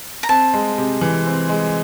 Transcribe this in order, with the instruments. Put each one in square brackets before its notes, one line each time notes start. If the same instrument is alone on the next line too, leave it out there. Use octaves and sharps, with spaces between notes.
[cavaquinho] A#5
[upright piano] C4 [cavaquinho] A5
[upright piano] G#3
C3
E3
C4
G#3